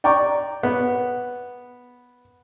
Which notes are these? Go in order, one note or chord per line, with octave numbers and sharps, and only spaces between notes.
D5 G5 A#5 C#6 D6
B3